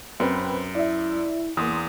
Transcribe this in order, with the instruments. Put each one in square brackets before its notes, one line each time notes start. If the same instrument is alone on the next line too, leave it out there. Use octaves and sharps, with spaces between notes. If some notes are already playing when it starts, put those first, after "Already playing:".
[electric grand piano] F#2 [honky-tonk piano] C4 B4 B5
[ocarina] E4 [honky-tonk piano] D5 E5
[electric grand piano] E2 [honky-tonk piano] A#3 C6 D#6